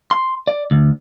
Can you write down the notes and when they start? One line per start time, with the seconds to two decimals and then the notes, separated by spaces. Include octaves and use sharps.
0.11 C6
0.47 D5
0.71 D2